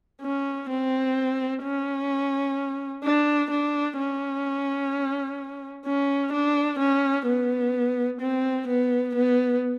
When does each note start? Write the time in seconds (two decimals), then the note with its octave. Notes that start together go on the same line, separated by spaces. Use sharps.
0.21 C#4
0.69 C4
1.63 C#4
3.04 D4
3.50 D4
3.98 C#4
5.86 C#4
6.32 D4
6.79 C#4
7.25 B3
8.21 C4
8.68 B3
9.15 B3